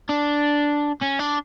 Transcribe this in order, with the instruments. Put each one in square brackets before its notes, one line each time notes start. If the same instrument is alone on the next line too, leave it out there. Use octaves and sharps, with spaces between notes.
[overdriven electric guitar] D4
C#4
D4